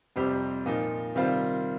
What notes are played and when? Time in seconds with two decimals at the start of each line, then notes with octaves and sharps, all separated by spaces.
0.16 F2 C3 G3 C4 G4
0.66 A#2 F3 D#4
1.15 C3 D#3 G3 C4 F4